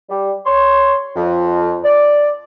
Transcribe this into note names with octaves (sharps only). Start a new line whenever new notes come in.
G3
C#5 C6
F2
D5